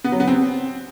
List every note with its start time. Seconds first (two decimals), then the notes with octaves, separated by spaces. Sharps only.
0.04 B3
0.12 F#3
0.20 B3
0.27 C4